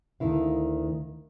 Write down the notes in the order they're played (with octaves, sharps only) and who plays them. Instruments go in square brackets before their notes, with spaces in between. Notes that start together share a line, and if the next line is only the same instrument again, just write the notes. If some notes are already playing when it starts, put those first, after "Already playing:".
[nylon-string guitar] D2 D#3 E4 F5